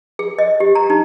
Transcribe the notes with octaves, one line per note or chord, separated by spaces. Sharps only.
G#4
D#5
G4
A#5
D#4